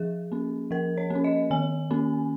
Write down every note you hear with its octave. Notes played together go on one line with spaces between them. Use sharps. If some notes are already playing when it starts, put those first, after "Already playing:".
Already playing: F3 G#4
A#3 C#4
F3 A#4
C#5
A#3 C#4
D#5
D#3 G#5
A#3 C#4